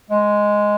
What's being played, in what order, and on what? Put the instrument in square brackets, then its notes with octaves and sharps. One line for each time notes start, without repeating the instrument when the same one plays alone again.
[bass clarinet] G#3